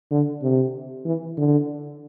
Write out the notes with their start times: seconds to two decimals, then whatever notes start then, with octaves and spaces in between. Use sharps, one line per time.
0.11 D3
0.42 C3
1.05 E3
1.37 D3